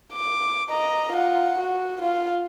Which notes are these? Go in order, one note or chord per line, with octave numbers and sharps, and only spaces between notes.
D6
D#5 A#5
F4 F#5
F#4
F4 F5